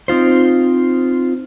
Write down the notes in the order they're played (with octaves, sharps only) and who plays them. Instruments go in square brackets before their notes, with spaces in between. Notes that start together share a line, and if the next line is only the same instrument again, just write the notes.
[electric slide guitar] C4 D#4 F4 C5